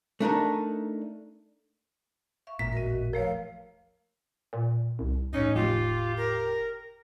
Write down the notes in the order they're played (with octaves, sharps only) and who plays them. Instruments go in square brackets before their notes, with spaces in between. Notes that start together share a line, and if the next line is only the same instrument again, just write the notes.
[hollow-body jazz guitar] A3 D4 D#4 A#4
[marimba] E5 F5 C#6
[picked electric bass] E1 A1 A#2 [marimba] E5 A#5 [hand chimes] B6
[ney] F#4 [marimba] A#4 D#5
[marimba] F3 A3 C#5 [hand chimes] A#4 [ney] F5
[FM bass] A#2
C2
[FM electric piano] E2 A2 [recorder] C#4 [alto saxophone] D#4
[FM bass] F1 [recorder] F4 [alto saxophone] G4
[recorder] A#4